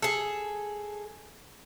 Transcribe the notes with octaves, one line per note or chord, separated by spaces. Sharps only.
G#4 A4